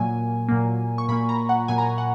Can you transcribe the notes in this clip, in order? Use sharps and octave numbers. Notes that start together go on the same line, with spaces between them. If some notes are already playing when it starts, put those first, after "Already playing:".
Already playing: A#2 F#3 A#3 G#5
A#2 F#3 A#3
C#6
A#2 F#3 A#3 B5
A#5
F#5
A#2 F#3 A#3 G#5
A#5
G#5
F#5